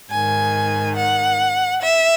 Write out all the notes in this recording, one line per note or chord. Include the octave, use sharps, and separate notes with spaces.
G#2 D#3 G#5
F#5
E5